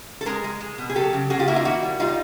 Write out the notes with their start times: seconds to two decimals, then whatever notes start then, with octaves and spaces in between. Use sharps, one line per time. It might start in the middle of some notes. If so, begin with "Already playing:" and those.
0.21 A4
0.26 G#3 G#4 A#4
0.44 G#3
0.60 G#3
0.78 B2
0.89 G#4
0.95 F#3 G4 A4
1.13 C#3
1.30 C#3 F#4 G#4
1.39 F4 G4
1.48 A#3 E4 F#4
1.56 D#4 F4
1.65 D#3 E4 F#4
1.82 G3
1.99 G3 D#4 F4